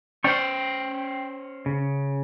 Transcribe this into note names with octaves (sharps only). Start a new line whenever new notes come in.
C#4 C5 D5 G5 C#6
G5
C#3